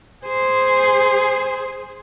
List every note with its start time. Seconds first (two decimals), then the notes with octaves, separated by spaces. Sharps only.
0.24 G#4 C5